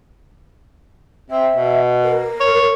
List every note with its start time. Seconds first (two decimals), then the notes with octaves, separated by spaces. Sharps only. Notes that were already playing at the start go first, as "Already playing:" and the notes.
1.31 C4 E5
1.53 B2
2.04 A#4
2.40 C#5